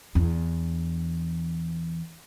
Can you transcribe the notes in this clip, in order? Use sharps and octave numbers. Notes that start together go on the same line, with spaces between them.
E2 D4